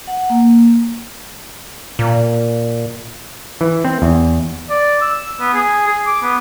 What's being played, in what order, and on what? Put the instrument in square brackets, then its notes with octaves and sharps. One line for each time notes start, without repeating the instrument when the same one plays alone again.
[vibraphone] F#5
A#3
[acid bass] A#2
[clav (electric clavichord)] E3
C4
E2
[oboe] D5
E6
B3
G#4
G#4
D6
B3